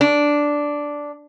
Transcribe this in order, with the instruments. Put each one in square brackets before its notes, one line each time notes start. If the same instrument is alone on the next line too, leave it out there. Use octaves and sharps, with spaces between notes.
[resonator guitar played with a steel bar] D4